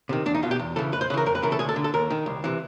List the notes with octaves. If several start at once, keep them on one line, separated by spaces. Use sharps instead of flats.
C3 D#3
E2 D4
D#4
B2 F4
G4
E2
C#3 E3 A4
F2 B4
C5
C#3 E3 A#4 B4
F2 A#4
B4
C#3 E3 A#4
A4
D2 G#4
A4
D3
A4
D#2 A#4
D#3
C2
C3 E3